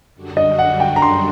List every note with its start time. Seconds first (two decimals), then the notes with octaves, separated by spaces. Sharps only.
0.14 F#2 D3 G3 D4 F#4
0.37 D#5
0.59 F#5
0.80 G5
0.96 A#5
1.02 C6